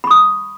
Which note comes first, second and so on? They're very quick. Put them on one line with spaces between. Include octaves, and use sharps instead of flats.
B5 C#6 D#6